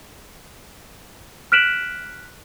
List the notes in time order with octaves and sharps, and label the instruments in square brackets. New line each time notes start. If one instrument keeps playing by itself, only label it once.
[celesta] F6 F#6 B6 D7 E7 F#7